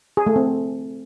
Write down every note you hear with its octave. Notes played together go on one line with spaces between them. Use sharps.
G#4
A3
C4